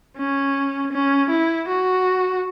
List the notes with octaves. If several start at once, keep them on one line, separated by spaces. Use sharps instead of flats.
C#4
C#4
E4
F#4